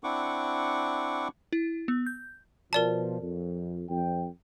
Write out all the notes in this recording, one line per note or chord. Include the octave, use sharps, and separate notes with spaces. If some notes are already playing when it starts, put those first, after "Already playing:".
C4 D4 E4 F#5 C#6 D6
E4
B3
G6
B2 F3 A#4 D5 A5
F2
F2 G5